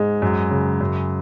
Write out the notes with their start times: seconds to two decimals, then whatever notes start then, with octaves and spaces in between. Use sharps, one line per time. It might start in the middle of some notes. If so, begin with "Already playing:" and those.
Already playing: G#2 G#3
0.22 F#2
0.51 C#3
0.81 F#2